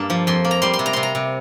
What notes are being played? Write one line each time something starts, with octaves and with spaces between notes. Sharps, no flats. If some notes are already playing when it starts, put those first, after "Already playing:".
Already playing: G2 A#3 A5
F3
F2 C6
A#3
A#5
G3 C6
C6
C3
A#5
C3 C6
A#5
C3